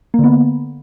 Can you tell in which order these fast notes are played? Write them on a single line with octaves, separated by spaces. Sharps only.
A#3 D3 B3